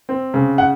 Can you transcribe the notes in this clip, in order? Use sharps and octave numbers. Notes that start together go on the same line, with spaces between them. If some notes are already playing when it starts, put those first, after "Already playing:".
C4
C#3
F#5